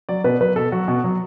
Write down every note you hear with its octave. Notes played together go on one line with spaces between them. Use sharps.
F#3 D5
B2 B4
F#3 B4
B2 A4
F#3 F#4
B2
F#3